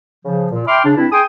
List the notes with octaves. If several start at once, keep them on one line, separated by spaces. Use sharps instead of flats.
C#3 F3
A#2
E5 G5 B5 C6 D6 F6
C#3 D4
G2 C4 D4 E4
G#4 G5 G#5 C6 D#6